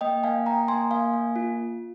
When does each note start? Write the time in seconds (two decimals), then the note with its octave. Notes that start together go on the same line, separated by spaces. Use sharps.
0.01 A#3 D#5 G5
0.23 A#3 F5 G#5
0.46 A#3 G5 A#5
0.68 A#3 G#5 C6
0.91 A#3 F5 G#5
1.14 A#3
1.36 F4